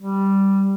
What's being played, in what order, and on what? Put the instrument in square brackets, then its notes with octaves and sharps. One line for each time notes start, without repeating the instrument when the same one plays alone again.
[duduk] G3